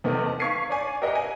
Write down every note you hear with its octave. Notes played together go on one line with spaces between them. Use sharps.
E2 C3 D#3 A3 B3
A5
F5 C#6 G#6 B6 C7 D#7
C#5 D5 G#5
G4 A#4 B4 D#5 E5 F#5
G#5